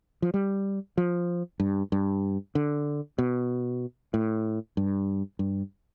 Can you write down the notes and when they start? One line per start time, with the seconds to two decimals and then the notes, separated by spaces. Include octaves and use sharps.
0.22 F3
0.34 G3
0.98 F3
1.60 G2
1.92 G2
2.55 D3
3.18 B2
4.14 A2
4.77 G2
5.39 G2